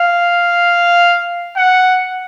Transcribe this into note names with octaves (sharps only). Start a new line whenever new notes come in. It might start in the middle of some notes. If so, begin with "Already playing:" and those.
Already playing: F5
F#5